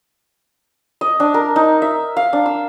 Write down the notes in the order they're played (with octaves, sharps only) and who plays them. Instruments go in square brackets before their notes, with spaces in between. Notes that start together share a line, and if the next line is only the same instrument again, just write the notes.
[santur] D#5
D4
A#4
D#4
E5
F5
D4
E6